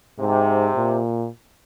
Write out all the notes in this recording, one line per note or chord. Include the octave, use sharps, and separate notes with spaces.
G#2 C3
A#2